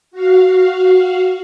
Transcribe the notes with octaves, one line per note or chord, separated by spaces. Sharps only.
F#4 F5